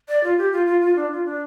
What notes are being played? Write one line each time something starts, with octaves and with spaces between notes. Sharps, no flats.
D5
F4
G4
F4
F4
F4
D4
F4
D4